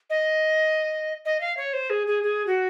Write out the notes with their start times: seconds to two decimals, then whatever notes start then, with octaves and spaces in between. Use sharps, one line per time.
0.10 D#5
1.25 D#5
1.41 F5
1.57 C#5
1.73 C5
1.90 G#4
2.07 G#4
2.23 G#4
2.47 F#4